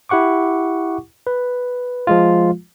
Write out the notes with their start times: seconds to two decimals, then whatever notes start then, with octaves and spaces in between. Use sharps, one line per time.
0.09 E4 G4 F#5 C#6 D6
1.27 B4
2.07 F3 G#3 F4